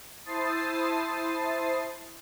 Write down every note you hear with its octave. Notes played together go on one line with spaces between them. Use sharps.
E4 C5 A5 D#6 A6 C7